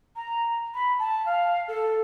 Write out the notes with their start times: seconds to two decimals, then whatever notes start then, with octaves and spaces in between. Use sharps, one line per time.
0.16 A#5
0.74 B5
0.99 A5
1.25 F5
1.68 A4